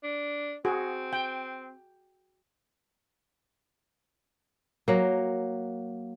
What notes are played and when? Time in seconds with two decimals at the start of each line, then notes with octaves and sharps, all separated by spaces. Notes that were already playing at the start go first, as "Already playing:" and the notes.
0.03 D4
0.65 C4 F#4 G#4
1.13 G5
4.88 F#3 A#3